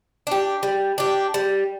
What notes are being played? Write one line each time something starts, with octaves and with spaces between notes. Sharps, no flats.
D4 G4
G3
D4 G4
G3